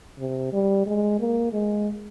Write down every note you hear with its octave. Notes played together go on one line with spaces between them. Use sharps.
C3
G3
G#3
A#3
G#3